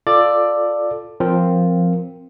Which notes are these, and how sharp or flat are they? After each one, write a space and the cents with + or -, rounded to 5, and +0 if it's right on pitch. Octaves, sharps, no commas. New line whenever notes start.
F4 +0 A4 +5 D5 +10
F3 +0 C4 +0 A#4 +0